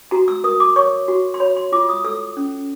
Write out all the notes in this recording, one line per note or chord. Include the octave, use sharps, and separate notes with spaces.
F#4 A#5
E6
A#4 D#6
D6
C#5 C#6
F#4
C6
C#5 B5
C6
F4 D6
D#6
A4 E6
C#4